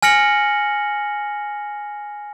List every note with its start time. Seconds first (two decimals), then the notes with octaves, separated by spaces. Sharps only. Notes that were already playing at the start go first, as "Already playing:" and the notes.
0.02 G#5 F6 A#6 C#7 F#7